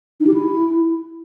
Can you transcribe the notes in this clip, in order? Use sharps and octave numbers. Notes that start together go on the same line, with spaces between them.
D#4
G4
E4